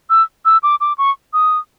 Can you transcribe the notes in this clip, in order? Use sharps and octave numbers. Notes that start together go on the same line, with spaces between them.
E6
E6
D6
D6
C#6
D#6